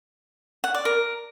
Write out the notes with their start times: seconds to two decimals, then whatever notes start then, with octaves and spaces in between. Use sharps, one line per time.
0.64 F#5
0.74 D5
0.85 A#4